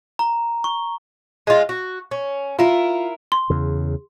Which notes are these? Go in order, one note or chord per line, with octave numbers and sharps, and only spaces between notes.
A#5
C#6
G#3 F4
F#4
C#4
E4 F4 A#4
C6
E2 C#3